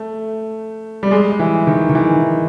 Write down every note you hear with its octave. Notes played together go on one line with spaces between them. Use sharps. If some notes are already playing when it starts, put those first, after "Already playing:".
Already playing: A3
G3
G#3
E3
D#3
D#3
E3